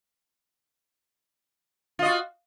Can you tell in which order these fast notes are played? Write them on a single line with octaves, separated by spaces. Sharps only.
F4 D#5 F#4